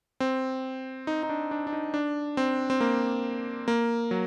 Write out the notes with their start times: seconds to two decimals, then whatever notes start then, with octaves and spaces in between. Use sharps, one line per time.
0.20 C4
1.07 D#4
1.23 D#4
1.29 D4
1.51 D4
1.67 D4
1.73 D#4
1.94 D4
2.37 C4
2.70 C4
2.81 A#3
3.68 A#3
4.11 F#3